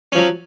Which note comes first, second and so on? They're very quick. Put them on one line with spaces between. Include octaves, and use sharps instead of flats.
C#4 F3 F#3